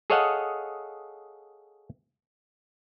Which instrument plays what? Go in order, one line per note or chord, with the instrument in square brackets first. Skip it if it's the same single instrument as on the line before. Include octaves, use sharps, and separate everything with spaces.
[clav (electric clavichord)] G#4 A4 C#5 D#5 F5 F#5